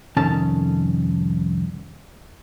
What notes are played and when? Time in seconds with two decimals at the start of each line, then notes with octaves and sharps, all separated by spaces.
0.17 C2 F2 D#3 C#4 A4 A5